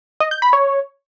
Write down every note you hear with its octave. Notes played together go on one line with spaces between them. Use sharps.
D#5
G6
B5
C#5